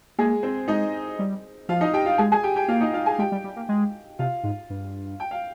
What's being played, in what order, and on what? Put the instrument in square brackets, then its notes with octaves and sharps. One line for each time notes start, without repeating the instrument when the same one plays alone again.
[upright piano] G#3 G#4 [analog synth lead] A#3
[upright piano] C4 C5
[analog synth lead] G#3 [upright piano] D#4 D#5
[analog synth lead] G3
[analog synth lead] F3 [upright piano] F4 F5
[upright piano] D#4 D#5
G4 G5
F4 F5
[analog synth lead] G#3 [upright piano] G#4 G#5
[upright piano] G#4 G#5
G4 G5
G4 G5
[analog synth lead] A#3 [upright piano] F4 F5
[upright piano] D#4 D#5
F4 F5
G#4 G#5
[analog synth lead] G#3 [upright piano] G4 G5
[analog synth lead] G3
G3
A#3
G#3
[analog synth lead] C3 [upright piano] F4 F5
[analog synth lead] G#2
G2
[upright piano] G5
F5